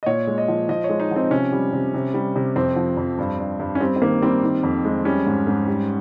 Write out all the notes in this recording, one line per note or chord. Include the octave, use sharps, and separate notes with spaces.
D#5
A#2 C#5
G#3
D#5
F3
F3 D#5
C#5
G#3
D#4
F3 C4
C3 C#4
G3
C3
C3
G3
C3
F2 C4
F3
F2
G2
G2
G2
C#4
G3 C4
C4
D#3 A#3
G3 C4
D#3
F2
G#3
G3 C#4
G#2
G#2
G3